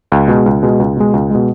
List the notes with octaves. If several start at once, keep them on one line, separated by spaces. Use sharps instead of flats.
C#2
B2 G#3
C#2
B2 G#3
C#2
B2 G#3
C#2
B2 G#3